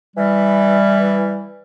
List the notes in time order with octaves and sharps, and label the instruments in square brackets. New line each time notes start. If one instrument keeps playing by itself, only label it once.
[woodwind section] E3 G3